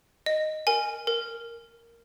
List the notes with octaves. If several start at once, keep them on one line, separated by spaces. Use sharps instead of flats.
D#5
A#4 G#5
A#4